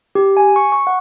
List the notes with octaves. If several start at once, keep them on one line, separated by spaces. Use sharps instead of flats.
G4
G#5
C#6
C#6
F#5